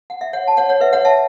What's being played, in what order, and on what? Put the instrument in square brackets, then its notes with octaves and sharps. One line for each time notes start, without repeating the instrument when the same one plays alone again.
[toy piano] F#5
E5
C#5 F#5
A5
C#5 F#5
C#5 F#5
B4 E5
C#5 F#5
E5 A5